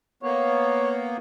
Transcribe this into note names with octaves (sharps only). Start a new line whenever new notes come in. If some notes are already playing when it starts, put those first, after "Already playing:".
A#3 B3 C#5